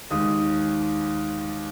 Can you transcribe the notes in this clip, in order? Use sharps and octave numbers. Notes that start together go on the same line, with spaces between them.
D#2 D#3 G#3 D#6